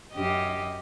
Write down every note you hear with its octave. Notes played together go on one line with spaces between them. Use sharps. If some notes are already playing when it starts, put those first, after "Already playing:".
F#2 G4 D#5